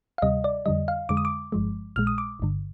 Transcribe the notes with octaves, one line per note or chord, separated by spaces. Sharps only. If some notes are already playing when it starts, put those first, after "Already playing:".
F5
D2 C3 G3 D#5
D5
F2 D3 G3 D#5
F5
F2 D3 G#3 D6
D#6
D6
G1 G2 F3 G#3
A#1 A#2 G#3 F6
D#6
D6
G1 G2 D3